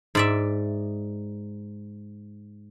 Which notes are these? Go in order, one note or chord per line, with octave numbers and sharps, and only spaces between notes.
G#2 D5 E5